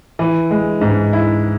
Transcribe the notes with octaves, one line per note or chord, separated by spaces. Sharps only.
E3
G#3
G#2
E4